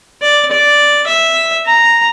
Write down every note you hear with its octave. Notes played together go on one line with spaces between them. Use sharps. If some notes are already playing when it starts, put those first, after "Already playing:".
D5
D5
E5
A#5